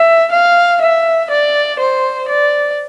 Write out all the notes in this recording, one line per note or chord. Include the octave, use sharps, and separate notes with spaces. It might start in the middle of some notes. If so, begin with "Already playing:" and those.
Already playing: E5
F5
E5
D5
C5
D5